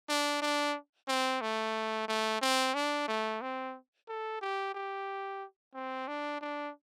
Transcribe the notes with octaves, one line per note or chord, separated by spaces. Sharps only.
D4
D4
C4
A3
A3
C4
D4
A3
C4
A4
G4
G4
C4
D4
D4